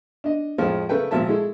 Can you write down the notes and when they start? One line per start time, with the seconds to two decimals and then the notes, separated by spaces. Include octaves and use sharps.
0.24 D4 D#5
0.58 F2 A2 F3 G#3
0.89 C#3 A3 A#4 B4 G5
1.11 G#1 A#2 F3 E5 A5
1.28 G#3 A3 E4